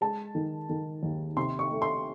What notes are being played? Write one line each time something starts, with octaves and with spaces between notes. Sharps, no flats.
G#3 A5
D#3
D#3
D#2
C3 C6
C#6
A3
C6